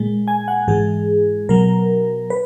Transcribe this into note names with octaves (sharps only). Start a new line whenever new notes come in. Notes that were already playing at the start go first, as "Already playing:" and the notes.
Already playing: A#2 G#3
G#5
F#5
G#2 E3 G#3 G#4
B2 F#3 A#4
B4